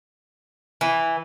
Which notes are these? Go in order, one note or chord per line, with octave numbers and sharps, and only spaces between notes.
E3